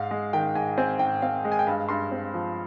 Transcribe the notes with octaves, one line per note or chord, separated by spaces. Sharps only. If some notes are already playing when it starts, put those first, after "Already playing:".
Already playing: G#2 F5
G#3
D#3 G5
G#2 G#5
C4 G#5
G#2 G5
C4 F5
G#3
G#5
G5
G2 F5
G2 C6
C4
F3